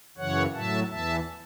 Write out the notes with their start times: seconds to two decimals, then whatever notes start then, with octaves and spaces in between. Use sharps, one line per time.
0.17 F#2 C#3 E3 C#5 F#5
0.54 A2 F#3 E5 A5
0.90 E2 E3 E5 A5